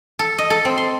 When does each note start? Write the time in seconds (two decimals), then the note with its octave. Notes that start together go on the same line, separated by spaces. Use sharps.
0.19 A4
0.38 D#5
0.50 A4
0.65 C4
0.77 C6